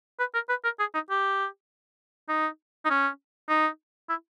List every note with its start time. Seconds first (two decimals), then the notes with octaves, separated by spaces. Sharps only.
0.19 B4
0.34 A#4
0.49 B4
0.64 A#4
0.80 G#4
0.94 D#4
1.10 G4
2.29 D#4
2.85 D#4
2.90 C#4
3.49 D#4
4.09 E4